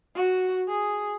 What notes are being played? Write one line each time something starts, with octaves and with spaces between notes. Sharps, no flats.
F#4
G#4